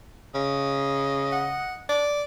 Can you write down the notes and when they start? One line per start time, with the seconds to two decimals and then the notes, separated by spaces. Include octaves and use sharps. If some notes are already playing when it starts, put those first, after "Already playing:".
0.35 C#3 D#5
1.32 F#5
1.89 D5